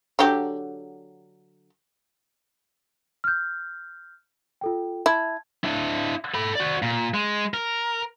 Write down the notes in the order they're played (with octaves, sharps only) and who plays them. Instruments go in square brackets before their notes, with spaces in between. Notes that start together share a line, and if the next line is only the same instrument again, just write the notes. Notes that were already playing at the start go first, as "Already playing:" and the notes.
[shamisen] D3 F#3 G4
[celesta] F6 G6
F4 A4 G5
[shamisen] E4 [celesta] A5 G#6
[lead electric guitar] D4 E4
A4 B5
F#4 D5
A#2
G#3
A#4